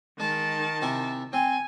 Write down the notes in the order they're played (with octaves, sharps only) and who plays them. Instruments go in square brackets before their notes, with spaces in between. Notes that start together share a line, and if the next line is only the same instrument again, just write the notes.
[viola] D#3 A5 [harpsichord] G#3
[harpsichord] C3 E4 G#5
[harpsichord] C4 [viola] G#5